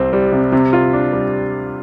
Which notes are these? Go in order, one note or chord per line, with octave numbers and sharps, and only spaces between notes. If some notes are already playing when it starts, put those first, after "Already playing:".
Already playing: C2 C4
G3
C3
C3
F4
D4
G3